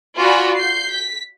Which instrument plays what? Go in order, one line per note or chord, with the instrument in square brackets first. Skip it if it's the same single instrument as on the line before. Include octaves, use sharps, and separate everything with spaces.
[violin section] F4 F#4 D5 G#5 B5
G6 C7
B6